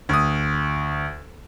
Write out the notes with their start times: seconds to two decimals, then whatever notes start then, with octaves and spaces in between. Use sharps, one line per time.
0.09 D2 D#6